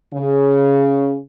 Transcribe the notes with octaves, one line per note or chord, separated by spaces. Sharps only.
C#3